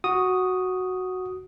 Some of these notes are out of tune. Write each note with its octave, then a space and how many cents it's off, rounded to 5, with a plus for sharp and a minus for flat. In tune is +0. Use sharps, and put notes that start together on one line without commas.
F#4 +0 D#6 +0